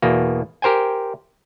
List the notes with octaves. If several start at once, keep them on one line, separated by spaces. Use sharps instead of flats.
E2 B2 A#3
G4 A#4 C5 G5 G#5